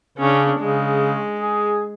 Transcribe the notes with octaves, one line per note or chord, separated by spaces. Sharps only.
C#3 C#4 D4
C#3 G#3
G#4